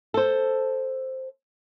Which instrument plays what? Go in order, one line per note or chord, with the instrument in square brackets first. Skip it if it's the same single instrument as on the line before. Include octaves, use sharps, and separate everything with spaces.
[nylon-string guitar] A4 C5